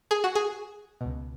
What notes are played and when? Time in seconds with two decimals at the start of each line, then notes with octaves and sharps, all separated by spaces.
0.11 G#4
0.24 F#4
0.35 G#4
1.01 C#2 B2